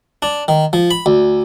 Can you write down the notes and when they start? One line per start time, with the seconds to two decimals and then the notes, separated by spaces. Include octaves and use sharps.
0.22 D4
0.48 D#3
0.73 F3
0.91 B5
1.06 D2